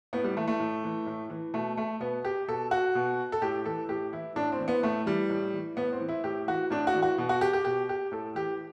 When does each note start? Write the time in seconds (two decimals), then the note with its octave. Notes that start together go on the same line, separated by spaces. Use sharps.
0.13 A2 B3
0.24 G3
0.36 E3 A3
0.48 A3
0.60 A2
0.84 E3
1.07 A2
1.30 E3
1.54 B2 A3
1.77 A3
2.00 B2 B3
2.25 G4
2.48 B2 A4
2.71 F#4
2.95 B2
3.32 A4
3.42 A2 G4
3.66 E3 A4
3.89 A2 G4
4.13 E3 E4
4.36 A2 D4
4.52 C4
4.59 E3
4.68 B3
4.83 A2 A3
5.06 E3 G3
5.30 A2
5.54 E3
5.76 A2 B3
5.92 C4
6.00 E3
6.09 E4
6.24 A2 G4
6.47 E3 F#4
6.70 A2 D4
6.87 F#4
6.95 E3
7.02 F#4
7.18 B2
7.29 F#4
7.41 G4
7.53 G4
7.65 B2 G4
7.89 G4
8.12 A2 A4
8.35 E3 G4